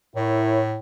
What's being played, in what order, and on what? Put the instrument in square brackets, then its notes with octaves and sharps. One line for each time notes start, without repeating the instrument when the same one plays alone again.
[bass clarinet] A2 [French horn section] E4 A#4 C#5